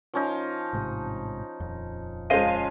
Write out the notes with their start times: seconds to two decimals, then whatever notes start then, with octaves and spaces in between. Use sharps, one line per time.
0.13 F3 C#4 D#4
0.73 A1 G#2 C3
1.60 D#1 F2
2.30 C#3 F3 G#3 C5 D#5 F5 D#7